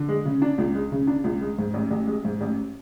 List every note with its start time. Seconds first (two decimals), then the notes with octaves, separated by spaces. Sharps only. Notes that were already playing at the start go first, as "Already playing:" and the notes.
Already playing: D3
0.08 G#3
0.25 C#3
0.42 D4
0.58 C#2
0.75 G#3
0.92 C#3
1.07 D4
1.24 C#2
1.41 G#3
1.58 G#2
1.74 A1
1.91 A1
2.07 G#3
2.25 G#2
2.41 A1